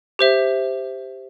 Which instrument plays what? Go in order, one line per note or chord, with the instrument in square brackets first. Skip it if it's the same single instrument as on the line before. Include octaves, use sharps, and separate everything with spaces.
[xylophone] G4 C5 E5